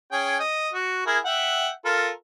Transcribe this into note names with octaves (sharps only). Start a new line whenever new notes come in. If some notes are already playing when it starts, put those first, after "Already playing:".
C#4 G#4 G5
D#5
F#4
E4 G#4 A#4
E5 F#5 G5
F4 A4 A#4